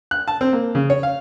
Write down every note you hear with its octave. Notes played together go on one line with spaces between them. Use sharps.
F#6
A5
C4
A#3
C#3
C#5
F5